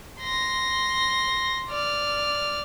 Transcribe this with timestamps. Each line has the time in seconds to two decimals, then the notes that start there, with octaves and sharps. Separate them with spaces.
0.21 C6 A#6
1.69 D5 F6